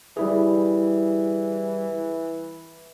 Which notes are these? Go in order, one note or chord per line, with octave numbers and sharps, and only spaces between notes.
E3 G3 E4 G#4